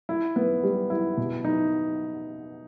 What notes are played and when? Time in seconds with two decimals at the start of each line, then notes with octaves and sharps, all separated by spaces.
0.09 E4
0.36 B3
0.64 G3
0.90 E4
1.17 B2
1.45 D#4